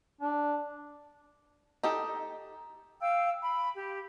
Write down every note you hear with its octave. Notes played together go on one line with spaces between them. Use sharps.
D4
D#4 G4 A4
F5 G5 E6
B5
G4